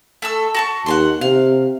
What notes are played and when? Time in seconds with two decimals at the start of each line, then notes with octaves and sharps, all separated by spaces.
0.22 A3 A4 E6
0.54 F#4 A5 C#6
0.86 D#2 F#5 G#5 C6
1.21 C3 F5